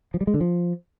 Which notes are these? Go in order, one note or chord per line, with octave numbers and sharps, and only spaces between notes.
F3
G3
G#3
D3
F3